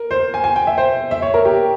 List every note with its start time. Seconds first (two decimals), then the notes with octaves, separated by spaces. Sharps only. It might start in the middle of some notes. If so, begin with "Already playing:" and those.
Already playing: A#4
0.11 C5
0.34 G#5
0.44 G#5
0.56 G5
0.67 E5
0.78 C5
1.11 E5
1.22 C#5
1.34 A#4
1.45 G4